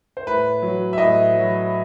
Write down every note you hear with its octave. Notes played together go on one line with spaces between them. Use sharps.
C5
A2 B4
F#3
E5
A2 D#5
F#3